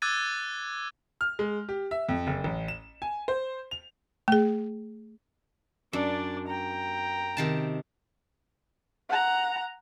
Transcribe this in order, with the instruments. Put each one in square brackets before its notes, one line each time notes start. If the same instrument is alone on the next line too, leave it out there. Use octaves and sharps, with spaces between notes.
[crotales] D6 E6 F#6 G#6 A6 D#7
[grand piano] F6
G#3
G4
E5
F2
F#1
A1
E7
G#5
C5
F7
[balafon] A3 G#4
[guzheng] F#2 [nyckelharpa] D4 D5
[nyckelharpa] G5 A#5
[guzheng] C3 D#3 A5
[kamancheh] F#5 A#5